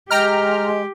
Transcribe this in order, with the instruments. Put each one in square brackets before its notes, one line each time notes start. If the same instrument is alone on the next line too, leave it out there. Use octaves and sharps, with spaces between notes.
[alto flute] G#3 [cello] G4 [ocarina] D#5 [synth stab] G5 A#5 F6